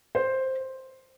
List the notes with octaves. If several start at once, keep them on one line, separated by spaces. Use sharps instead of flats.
C5